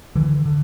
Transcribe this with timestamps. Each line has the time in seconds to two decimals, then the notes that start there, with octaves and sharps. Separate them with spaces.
0.16 D3 E3
0.46 D3